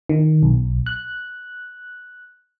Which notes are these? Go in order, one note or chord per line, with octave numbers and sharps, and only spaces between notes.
D#3
B1
F#6